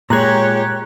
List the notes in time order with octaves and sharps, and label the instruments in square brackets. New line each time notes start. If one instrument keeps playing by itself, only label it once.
[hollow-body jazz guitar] A#2 G#3 [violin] G4 C#5 [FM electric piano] A#5 F#6 G#6